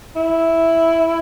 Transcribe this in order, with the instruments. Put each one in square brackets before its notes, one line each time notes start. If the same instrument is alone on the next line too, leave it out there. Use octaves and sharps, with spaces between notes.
[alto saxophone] E4